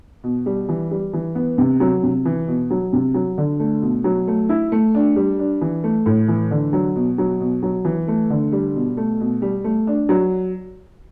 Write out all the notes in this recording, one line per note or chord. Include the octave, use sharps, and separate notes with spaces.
B2
G3
E3
G3
E3
B3
C3
F#3
C3
E3
B2
F#3
C3
F#3
D3
A3
B2
F#3
A3
E4
A3
D4
G3
D4
E3
A3
A2
E3
D3
F#3
B2
F#3
B2
F#3
E3
A3
D3
G3
B2
A3
B2
G3
A3
D4
F#3